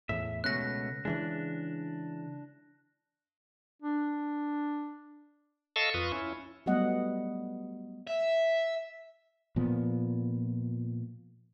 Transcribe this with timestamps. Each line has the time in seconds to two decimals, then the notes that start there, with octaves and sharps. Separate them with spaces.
0.09 E2 A2 E5
0.44 C#2 B2 A3 C#4 F#6 A#6
1.05 C#3 E3 G#3 D4
3.82 D4
5.76 A4 D#5 F5 A5 C#6 E6
5.94 F2 F4 B4 C#6 D#6
6.12 C#4 E4
6.66 F#3 G3 A3 B3 D#5 F#5
8.07 E5
9.56 A#2 F3 B3